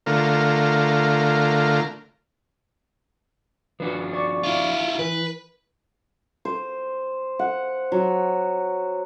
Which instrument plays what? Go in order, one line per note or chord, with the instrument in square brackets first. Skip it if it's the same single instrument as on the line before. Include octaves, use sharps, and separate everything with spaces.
[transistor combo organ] D3 A3 F4 A#4
[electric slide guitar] F3 D4 F#4 [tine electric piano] B4
[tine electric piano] D5 C#6
[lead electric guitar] E4 F4
[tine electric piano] E3 [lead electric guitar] B4
[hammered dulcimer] C5
F#5
F#3